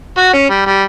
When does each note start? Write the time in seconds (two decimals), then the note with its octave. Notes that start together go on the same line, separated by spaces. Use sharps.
0.17 F#4
0.33 C#4
0.50 G3
0.66 G3